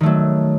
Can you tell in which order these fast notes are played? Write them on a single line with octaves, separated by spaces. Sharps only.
D#3 A3 F#3